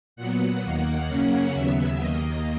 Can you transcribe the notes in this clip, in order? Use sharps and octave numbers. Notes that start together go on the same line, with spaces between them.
A#2 F#3 B3 F#5
D#2 D#3 A#3 F#5
F#2 C#3 F#3 A#3 C#4
D#2 C#3 F#3 B3 E5
D#2 D#3 A#3 D#5